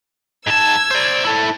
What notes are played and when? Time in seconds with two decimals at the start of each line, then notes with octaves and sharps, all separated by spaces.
0.47 G#2 A5 E6 G#6
0.91 C5 D5
1.25 E4 A4